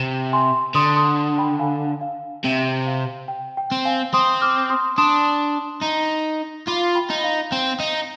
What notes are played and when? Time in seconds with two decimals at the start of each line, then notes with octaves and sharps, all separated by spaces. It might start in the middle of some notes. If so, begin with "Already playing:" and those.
Already playing: C3
0.33 G#5 C6
0.75 D3 C6 D#6
0.96 C6 D#6
1.38 G5 B5
1.59 F5 G#5
2.01 F5
2.44 C3 G5
2.87 F5
3.28 G5
3.57 G5
3.71 C4
3.85 F5 G#5
4.13 C4 C6 D#6
4.42 D6 F6
4.70 C6 D#6
4.98 D4 C6 D#6
5.83 D#4
6.67 F4 B5 D6
6.95 G5 B5
7.10 D#4
7.24 F5
7.52 C4
7.80 D#4